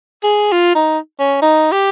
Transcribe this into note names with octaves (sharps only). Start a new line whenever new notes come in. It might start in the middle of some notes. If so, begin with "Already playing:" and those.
G#4
F4
D#4
C#4
D#4
G4